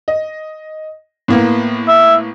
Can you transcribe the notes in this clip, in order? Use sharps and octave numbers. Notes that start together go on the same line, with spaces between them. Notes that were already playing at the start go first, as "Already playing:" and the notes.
D#5
A2 A#3 B3
E5